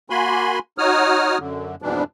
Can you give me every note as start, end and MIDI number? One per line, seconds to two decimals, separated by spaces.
0.10 0.59 58
0.10 0.59 66
0.10 0.59 80
0.10 0.59 83
0.10 0.59 84
0.78 1.38 63
0.78 1.38 66
0.78 1.38 73
0.78 1.38 87
0.78 1.38 89
1.39 1.75 42
1.39 1.75 50
1.82 2.03 41
1.82 2.03 44
1.82 2.03 47
1.82 2.03 52
1.82 2.03 55
1.82 2.03 62